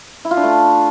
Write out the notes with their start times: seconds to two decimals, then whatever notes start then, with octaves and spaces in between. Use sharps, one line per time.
0.25 E4
0.31 F4
0.37 D4
0.43 A3